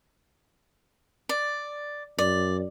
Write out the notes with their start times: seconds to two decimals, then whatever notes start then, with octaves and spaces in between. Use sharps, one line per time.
1.29 D5
2.18 F#2 D5